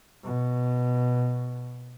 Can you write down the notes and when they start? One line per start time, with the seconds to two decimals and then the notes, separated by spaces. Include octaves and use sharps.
0.24 B2